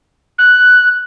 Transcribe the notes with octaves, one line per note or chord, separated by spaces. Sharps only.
F#6